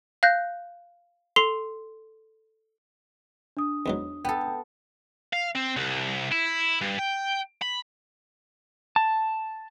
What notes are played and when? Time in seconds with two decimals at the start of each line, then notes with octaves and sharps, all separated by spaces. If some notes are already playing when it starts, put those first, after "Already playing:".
0.23 F5 F#6 G6 A#6
1.36 A4 C6 C7 F7 G7
3.57 D4 D#6
3.86 E2 G#2 F#3
4.25 B3 A4 G5
5.33 F5
5.56 C4
5.76 C2
6.32 E4
6.82 G2
6.99 G5
7.62 B5
8.96 A5